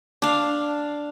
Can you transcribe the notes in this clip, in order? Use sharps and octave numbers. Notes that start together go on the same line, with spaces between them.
D4 F5